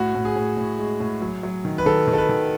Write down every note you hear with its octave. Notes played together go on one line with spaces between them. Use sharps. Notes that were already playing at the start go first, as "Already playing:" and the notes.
Already playing: A2 F#4
A2
G#4
A2
A2
G#3
A2
F#3
F#3
D#3
B4
D#3 A4
D#3
A4
B4
D#3